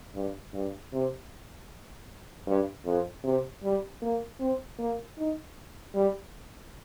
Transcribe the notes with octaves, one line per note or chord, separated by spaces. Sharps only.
G2
G2
C3
G2
F2
C3
G3
A#3
C4
A#3
D#4
G3